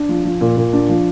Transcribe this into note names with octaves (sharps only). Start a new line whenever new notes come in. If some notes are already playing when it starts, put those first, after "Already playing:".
Already playing: D4
F3
F3
A#2
A#2
D4
F3